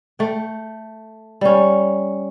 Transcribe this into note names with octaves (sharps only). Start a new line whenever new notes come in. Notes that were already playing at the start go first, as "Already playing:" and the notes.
A3 G5
G3 C#4